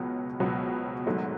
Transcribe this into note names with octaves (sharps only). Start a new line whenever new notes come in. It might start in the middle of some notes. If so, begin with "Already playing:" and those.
Already playing: C#2 B2 F#3 B3
C#2 B2 F#3 B3
G#1 G#2 F#3 A3